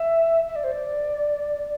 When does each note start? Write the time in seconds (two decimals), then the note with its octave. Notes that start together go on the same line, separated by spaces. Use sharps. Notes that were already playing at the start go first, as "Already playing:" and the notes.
Already playing: E5
0.48 E5
0.56 D5
0.64 C5
0.72 D5